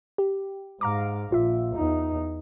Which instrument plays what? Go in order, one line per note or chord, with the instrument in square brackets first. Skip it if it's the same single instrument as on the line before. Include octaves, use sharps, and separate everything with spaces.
[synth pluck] G4
[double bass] G#2 [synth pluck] F5 A#5 D6
[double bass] A#1 [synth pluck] F4 E5
[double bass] E2 D#4